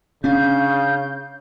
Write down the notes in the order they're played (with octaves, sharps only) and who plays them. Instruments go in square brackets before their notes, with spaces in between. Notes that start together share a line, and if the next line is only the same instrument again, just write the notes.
[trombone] C#3 [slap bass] C#4 D4 [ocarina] F5 [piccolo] G6